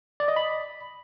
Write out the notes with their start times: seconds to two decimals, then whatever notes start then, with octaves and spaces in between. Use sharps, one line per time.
0.20 D5
0.28 D#5
0.36 B5